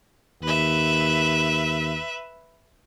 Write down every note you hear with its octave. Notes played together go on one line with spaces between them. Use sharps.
D#2 B4 E5